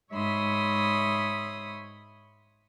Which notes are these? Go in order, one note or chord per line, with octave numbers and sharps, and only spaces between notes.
G#2 C#5 E5 B5 C6 D#6